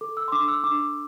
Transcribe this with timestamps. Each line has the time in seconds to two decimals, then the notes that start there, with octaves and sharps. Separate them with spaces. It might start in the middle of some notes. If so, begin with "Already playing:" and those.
0.01 A4 D6
0.17 E6
0.28 C6
0.32 D4 D6
0.48 E6
0.64 D4 D6